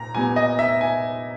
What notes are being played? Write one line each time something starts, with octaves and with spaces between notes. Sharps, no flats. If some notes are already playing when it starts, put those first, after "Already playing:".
Already playing: A#2 A#5
A#2 G3 B3 G#5
D#5
E5
G#5